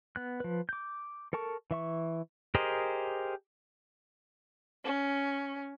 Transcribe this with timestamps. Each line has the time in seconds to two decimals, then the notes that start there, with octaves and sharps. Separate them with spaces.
0.16 B3 F#6
0.40 F3 B4
0.69 D6 G6
1.33 A4 A#4 A5 C#6
1.71 E3 E5 C#6
2.55 G4 G#4 A#4 C5 D#5
4.83 C#4